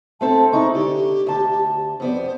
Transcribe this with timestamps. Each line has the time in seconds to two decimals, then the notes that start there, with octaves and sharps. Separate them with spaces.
0.21 A3 C4 A4 A5
0.52 G#3 D#4 E4 C#6
0.75 D3 G4
1.27 D2 A5
2.00 F2 B3 C5 D5